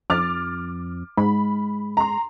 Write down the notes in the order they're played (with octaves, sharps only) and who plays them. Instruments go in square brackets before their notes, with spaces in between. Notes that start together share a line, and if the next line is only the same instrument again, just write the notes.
[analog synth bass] F2 [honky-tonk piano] D6 F6 A6
[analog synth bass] G#2 [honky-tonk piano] B5
[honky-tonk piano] A#5 C6